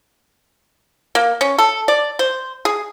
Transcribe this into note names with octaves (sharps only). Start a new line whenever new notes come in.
A#3
C#4
A4
D5
C5
G#4